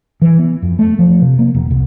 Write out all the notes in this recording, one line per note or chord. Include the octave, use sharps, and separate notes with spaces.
E3
B3
F2
A3
F3
C3
A#3
E1
C2